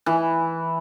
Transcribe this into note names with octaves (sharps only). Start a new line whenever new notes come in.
E3